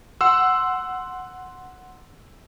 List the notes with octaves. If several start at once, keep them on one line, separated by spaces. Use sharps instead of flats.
F#5 C6 E6